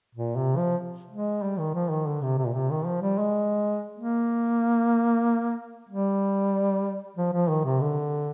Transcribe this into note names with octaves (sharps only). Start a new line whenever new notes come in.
A#2
C3
F3
G#3
G3
D#3
F3
D#3
D3
C3
C3
A#2
C3
D#3
F3
G3
G#3
A#3
G3
F3
F3
D#3
C3
D3